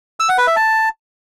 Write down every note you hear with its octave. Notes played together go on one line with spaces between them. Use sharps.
E6
F#5
B4
E5
A5